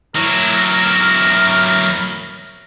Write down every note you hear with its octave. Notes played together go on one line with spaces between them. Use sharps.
F#3 E4 A#4